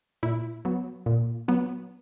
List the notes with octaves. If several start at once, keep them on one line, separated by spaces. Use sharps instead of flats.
A#2 E4
F#3 B3
A#2
F#3 B3